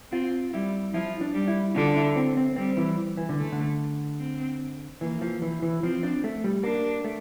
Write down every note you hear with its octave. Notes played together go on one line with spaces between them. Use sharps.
C4 F4
G3 E4
F3 E4
D4
G3
E4
D3 F4
E4
C4
C4
G3 C4
E3
E3
D3
A3
D3
C4
E3 A#3
F3
E3
E3
F3 C4
D4
A3
G3
A#3 D4
A3